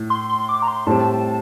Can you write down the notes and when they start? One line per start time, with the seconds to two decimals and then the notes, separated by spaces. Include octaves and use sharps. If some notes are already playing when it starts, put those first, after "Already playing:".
Already playing: A2
0.10 C6
0.29 C6
0.49 D6
0.62 A#5
0.68 C6
0.87 A2 G3 C4 G4 A5